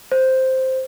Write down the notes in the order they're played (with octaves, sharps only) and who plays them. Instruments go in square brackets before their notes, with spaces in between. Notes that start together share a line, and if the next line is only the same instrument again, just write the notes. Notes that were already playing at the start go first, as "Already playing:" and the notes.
[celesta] C5